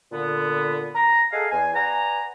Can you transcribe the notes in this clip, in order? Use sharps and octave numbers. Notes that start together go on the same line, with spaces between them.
A#2 D3 B3
A#5
G#4 A4 D#5 F5 F#5 G#5
E2 G#5
B4 D5 F#5 G#5 A#5